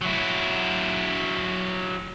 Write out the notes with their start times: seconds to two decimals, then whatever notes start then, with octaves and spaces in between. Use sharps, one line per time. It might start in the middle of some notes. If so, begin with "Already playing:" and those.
0.01 F#3 E4